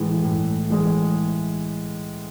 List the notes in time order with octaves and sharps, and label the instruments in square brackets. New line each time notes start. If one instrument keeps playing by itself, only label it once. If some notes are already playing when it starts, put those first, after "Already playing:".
Already playing: [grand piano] A2 E3 G#3
A2
E3 G#3